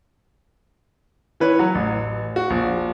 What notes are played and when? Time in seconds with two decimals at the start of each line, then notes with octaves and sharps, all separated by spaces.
1.40 E3 B4 C#5
1.59 F#3
1.75 A1
2.36 F#4
2.50 A#1